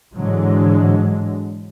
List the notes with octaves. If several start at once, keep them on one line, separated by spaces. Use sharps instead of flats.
G#2 D3 E3 F#3 G#3